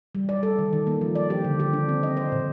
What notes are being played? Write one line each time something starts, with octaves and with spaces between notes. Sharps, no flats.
G3
D5
A4
D#3
D#3
A#3
F3
D5
G4
D3
G4
D4
C4
D#5
C5
A#2